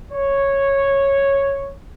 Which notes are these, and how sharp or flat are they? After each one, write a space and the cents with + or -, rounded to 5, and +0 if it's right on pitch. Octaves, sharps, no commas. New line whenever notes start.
C#5 -5